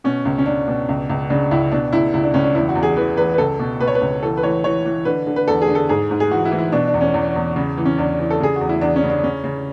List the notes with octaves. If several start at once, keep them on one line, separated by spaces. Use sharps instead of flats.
B2 C#4
C#2
C#4
C#2 D4
B2
C#2
C#2
C#3 D4
C#2 E4
B2 D4
C#2 E4
C#2 E4
D4
C#2 C#4
D4
E2 E4
F#4
E2
G#4
E3 B4
E2 B4
B4
C#2 A4
B2
B2 B4
C#5
B4
C#2
E3 A4
B4
E3 C#5
E3 C#5
E3
D3 B4
D3
B4
E2 A4
G#4
D3
A4
G#2 G#4
G#2
G#4
E3 F#4
E4
E3
E4
B2 D4
D4
E2
C#4
E2
E2
C#3
E3
C#4
E2 D4
E3
A4
C#3 G#4
F#4
E2
E4
E2 D4
C#4
C#3
D4
C#3 C#4
C#3